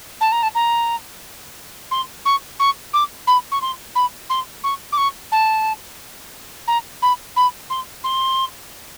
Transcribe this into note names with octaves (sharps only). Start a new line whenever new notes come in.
A5
A#5
A5
A#5
C6
C#6
C#6
D6
B5
C#6
C6
B5
C6
C#6
D6
C#6
A5
A#5
B5
B5
C6
C6